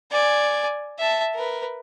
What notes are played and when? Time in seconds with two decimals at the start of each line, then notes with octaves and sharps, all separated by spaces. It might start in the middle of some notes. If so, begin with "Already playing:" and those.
0.12 D5 G#5
0.99 E5 A5
1.35 A#4 B4